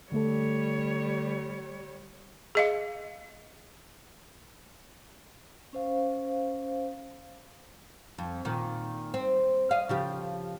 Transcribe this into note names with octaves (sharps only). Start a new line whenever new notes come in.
D3 G3 A3 A4 C#5
G#4 D#5 F5
C#4 C5 F5
F2
A#2 D#3
C4
D#5 F5
C#3 F3 G4